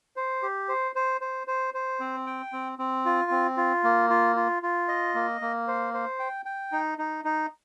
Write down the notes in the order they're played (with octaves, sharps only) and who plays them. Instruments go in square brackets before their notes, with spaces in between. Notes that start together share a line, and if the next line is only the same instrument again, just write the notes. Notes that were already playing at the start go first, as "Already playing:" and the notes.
[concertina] C5
G4
C5
C5
C5
C5
C5
C4
G5
C4
C4
F4
C4
F4
A#3
F4
F4
F4
D#5
A#3
A#3
C5
C5
G5
G5
D#4
D#4
D#4